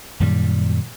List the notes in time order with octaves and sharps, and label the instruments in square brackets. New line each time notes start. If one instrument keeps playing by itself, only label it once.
[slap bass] F#2 A#2 D#3 G3